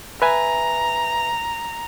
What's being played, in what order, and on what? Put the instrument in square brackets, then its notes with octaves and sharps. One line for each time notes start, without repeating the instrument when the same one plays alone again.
[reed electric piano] B4 E5 G#5 [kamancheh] A#5